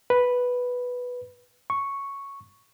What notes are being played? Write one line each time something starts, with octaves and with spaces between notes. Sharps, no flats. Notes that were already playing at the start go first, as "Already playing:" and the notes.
B4
C#6